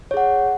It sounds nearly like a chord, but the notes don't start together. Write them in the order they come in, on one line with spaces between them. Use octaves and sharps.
C#5 G#4 F#5